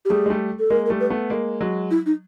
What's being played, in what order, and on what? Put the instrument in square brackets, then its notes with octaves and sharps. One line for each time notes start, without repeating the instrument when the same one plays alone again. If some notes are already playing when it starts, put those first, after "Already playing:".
[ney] G4
[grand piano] G3 A3 [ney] G#4
[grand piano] G#3
G3 A3
[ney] A4
[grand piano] G#3 A#3 [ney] A#4
[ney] A#4
[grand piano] G3 A3
[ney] B4
[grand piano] A3 B3
G#3 A#3
F#3 G#3
[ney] E4
D#4